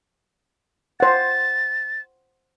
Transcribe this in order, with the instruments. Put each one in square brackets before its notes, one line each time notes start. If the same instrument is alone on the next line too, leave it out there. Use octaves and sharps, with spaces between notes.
[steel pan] C5 F#5 [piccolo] A6